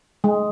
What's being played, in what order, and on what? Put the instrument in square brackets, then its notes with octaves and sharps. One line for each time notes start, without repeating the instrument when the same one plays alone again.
[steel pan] G#3